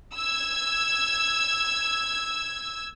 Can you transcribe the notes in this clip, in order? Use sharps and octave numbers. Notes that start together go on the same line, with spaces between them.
E6 G#6